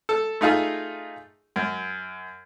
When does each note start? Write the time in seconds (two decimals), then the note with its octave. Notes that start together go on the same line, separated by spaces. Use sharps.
0.09 A4
0.41 A3 D#4 F4 G#4
1.56 F#2